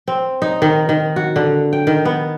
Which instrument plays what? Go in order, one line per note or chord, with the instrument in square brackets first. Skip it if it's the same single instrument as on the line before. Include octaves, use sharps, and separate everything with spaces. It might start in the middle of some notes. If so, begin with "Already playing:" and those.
[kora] C4
D#4
D#3
D#3
F#4
D3
G5
D#3
B3